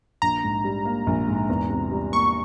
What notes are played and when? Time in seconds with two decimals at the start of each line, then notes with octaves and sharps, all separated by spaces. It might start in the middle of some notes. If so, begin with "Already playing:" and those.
0.22 A#1 A#5
0.44 G#2
0.64 G3
0.85 A#3
1.07 A#1
1.28 G#2
1.49 E2
1.70 C3
1.91 G3
2.12 A#3 C#6